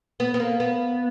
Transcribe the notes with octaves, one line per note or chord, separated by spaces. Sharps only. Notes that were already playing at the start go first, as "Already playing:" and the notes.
B3
B3
A#3
B3